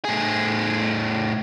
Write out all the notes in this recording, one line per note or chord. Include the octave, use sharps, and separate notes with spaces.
A2 G#4